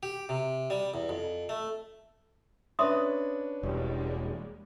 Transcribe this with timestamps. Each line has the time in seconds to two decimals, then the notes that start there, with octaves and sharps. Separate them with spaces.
0.03 G4
0.29 C3
0.70 G3
0.94 E2
1.09 F2
1.49 A3
2.79 C#4 D4 B4 E5 C6 D#6
3.63 E1 G3 G#3 A#3